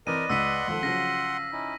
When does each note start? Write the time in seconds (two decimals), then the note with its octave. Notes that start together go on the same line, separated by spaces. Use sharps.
0.07 E3 C4 A#4 B4 D5 D#5 D#7
0.30 C#2 F#5 C6 E6 B6 D#7
0.67 G#1 F3 A4
0.83 C#3 F3 F#3 F5 A#6
1.52 C#4 D#4 E4